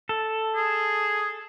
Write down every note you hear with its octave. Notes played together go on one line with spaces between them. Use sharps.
A4
G#4